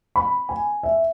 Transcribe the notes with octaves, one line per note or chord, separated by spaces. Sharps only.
B5
G#5
E5